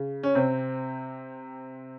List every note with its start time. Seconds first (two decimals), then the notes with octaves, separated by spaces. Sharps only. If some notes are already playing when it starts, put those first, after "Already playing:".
Already playing: C#3
0.23 C#4
0.35 C3 C4